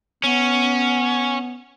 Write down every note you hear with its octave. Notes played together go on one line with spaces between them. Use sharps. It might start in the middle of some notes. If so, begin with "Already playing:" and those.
B3 C#4